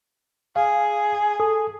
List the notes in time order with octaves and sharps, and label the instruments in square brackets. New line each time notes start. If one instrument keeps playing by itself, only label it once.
[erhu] G#4 [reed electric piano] F5
[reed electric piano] A4 D#6